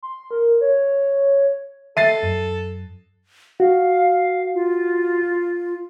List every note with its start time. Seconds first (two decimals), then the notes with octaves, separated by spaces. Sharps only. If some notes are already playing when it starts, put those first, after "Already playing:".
0.03 C6
0.31 A#4
0.61 C#5
1.97 A4 E5 A6 C7 D#7
2.23 F#2
3.60 F#4 F5
4.54 F4